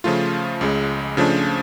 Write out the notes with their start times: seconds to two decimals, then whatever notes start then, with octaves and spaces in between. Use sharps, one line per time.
0.04 C#3 F3 A3 F4
0.61 C#2 C#3 G#3
1.17 C#3 F3 A3 D4